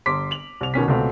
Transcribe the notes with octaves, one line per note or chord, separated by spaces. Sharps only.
G1 C6 D6 B6
F7 F#7
C2 F7
B2 D#3 C#4 B6
C#2 B2 A3 C4